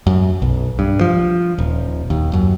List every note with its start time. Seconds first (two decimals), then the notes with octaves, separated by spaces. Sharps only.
0.07 F#2
0.42 B1
0.79 G2
1.01 F3
1.58 D#1
2.10 D#2
2.33 F#2